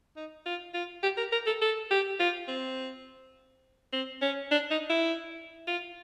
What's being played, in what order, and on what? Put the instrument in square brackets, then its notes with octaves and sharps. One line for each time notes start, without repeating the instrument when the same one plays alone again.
[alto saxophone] D#4
F4
F4
G4
A#4
A#4
A4
A4
G4
F4
C4
C4
C#4
D4
D#4
E4
F4